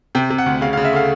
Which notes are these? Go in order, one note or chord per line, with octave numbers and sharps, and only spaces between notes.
C3 G5
C3
F#5
D2
C#3 F5
F5
C#3
E5
A3 F5